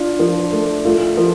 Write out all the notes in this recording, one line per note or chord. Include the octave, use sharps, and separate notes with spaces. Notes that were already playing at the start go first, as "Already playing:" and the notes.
Already playing: D4 F4
F3
A3
A3 F4
F3